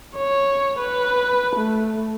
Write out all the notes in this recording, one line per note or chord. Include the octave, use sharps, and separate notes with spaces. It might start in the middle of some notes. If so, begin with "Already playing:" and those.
C#5
B4
A3